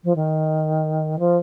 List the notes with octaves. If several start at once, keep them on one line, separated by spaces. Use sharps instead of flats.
F3
D#3
F3